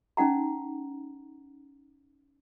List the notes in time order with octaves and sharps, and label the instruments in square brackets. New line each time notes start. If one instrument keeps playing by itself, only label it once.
[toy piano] C#4 D#4 F#5 A#5